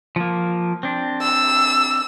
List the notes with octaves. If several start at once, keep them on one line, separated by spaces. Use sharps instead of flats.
F3 A#3
C4 D4
E6